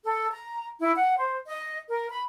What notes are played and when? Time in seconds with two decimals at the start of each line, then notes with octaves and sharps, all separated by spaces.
0.03 A4
0.30 A#5
0.79 E4
0.95 F#5
1.16 C5
1.47 D#5
1.88 A#4
2.10 B5